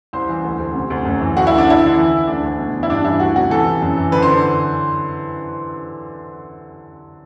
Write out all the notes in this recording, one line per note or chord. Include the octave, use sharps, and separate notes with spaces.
C2 C5
E3
D2
D2
C3
D2
F#2
E3
D2 F#4
D2 E4
D4
D2 E4
D3
E3
E3
D2 D4
D2
B2
E2
E4
G2 D4
E3 E4
D2 F#4
C3 F#4
E3 A4
E3
F#2
E3
D3 B4
C5
D3